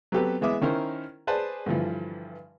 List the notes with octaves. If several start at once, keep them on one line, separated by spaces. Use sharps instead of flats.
F#3 B3 C4 G4 A4 B4
E3 G#3 B3 E5 D6 D#6
D#3 C#4 E4 A#4 C5
G#4 B4 C5 D5 A5
G2 D3 E3 F3